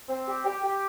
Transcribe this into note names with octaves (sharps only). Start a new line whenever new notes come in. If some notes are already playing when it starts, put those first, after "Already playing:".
C4
G4
G4
G4